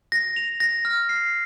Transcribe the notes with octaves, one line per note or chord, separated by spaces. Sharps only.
A#6
F7
A#6
F6
C7